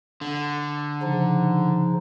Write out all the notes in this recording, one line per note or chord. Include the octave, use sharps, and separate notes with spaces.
D3
C#3 F3 D#4